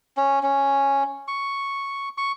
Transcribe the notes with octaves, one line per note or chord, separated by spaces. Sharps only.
C#4
C#4
C#6
C#6